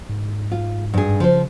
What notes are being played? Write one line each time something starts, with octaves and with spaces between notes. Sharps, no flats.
G#2
F4
G2 G#4
C#3 F3 C5